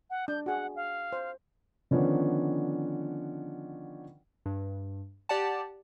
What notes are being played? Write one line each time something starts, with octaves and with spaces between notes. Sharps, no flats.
F#5
D4 G6
F#4 G#4 F#5
F5
C5
D3 D#3 F3 B3 C#4 D4
G2
G4 D5 F#5 A5